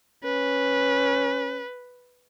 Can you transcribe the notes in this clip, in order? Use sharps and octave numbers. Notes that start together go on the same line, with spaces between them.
C#4 B4